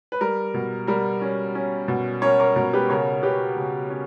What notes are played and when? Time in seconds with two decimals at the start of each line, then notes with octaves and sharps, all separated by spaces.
0.12 B4
0.21 G3 A#4
0.54 B2
0.87 G3 A#4
1.22 C#4
1.55 C#4
1.88 B2
2.22 C#4 A#4 C#5
2.40 A#4 C#5
2.56 B2 A#4
2.73 G4 B4
2.90 C#3 A#4 C#5
3.23 C#3 G4 B4
3.56 C#3
3.90 C#4